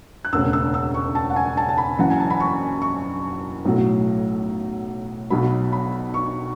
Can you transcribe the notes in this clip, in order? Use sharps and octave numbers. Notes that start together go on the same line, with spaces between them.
F#6
E1 D2 C#3 E6
E6
E6
C#6
A5
F#5
G#5
A5
A5
B5
F#1 F#2 E3 F#5
G#5
A5
B5
C#6
C#6
B1 A2 F#3 A3
B1 B2 F#3 B5
B5
C#6